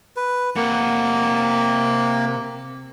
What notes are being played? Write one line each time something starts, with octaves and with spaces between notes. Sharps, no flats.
B4
C3 A#3 F#5